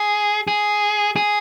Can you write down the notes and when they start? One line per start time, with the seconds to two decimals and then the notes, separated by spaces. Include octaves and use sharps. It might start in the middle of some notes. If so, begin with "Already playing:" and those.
Already playing: G#4
0.47 G#4
1.16 G#4